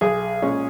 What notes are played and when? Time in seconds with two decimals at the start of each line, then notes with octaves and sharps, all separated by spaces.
0.01 B1 G#4
0.42 A#2 G#3 C#4